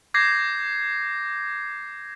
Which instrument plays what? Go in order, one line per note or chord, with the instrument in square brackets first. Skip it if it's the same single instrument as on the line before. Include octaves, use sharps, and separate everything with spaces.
[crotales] D6 G6 G#6 A#6 C7